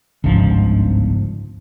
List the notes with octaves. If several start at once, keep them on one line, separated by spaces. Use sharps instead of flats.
G1 C#2 G#2 F3